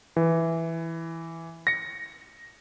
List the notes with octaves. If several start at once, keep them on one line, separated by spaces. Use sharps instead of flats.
E3
A#6 C#7